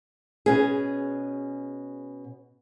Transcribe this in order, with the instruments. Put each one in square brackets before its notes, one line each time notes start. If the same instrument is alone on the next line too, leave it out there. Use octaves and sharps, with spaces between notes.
[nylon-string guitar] B2 C#4 G#4